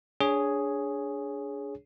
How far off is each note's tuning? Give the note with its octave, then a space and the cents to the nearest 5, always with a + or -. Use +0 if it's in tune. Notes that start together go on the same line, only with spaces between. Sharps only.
D4 -20 G#4 +0 C#5 +0